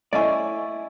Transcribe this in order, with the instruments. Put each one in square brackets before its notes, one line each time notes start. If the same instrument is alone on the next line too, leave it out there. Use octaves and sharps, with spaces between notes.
[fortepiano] A3 C#4 E4 [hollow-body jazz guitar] D5 F5 G#5 [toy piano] D#5 C#6